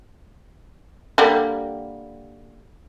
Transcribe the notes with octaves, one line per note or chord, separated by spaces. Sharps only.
D3 G3 A#3